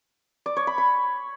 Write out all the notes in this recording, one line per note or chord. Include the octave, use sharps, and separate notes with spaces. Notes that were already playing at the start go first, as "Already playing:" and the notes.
D5
C#5
B5
B5